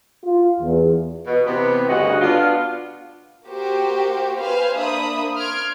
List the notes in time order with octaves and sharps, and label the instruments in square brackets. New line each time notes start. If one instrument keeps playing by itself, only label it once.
[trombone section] F4
E2
[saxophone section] B2
C3 E3 B3
D2 G2 C#3 F#4 D#5
B3 D4 F4
[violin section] A#3 F#4 G4 C5
B4 C5 F5 G#5
A#3 D4 C5 E5 B5 D#6
C6 F6 G#6 D7